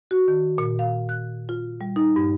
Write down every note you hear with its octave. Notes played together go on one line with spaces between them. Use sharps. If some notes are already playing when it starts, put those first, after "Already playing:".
F#4
D#3
A#2
F5
F#6
F4
G3
D#4
G2